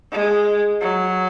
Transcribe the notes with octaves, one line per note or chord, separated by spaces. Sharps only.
G#3
F#3